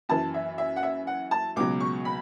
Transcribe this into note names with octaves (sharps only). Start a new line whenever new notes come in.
F#2 E3 A5
E5
E5
F#5
E5
F#5
A5
C#2 B2 F#3 D6
C#6
B5